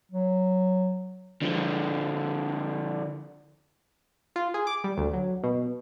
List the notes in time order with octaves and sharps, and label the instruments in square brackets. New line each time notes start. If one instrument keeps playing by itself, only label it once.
[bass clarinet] F#3
[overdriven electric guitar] D3 F3
[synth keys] F4
G#4
D6
G3
D2
F#3
B2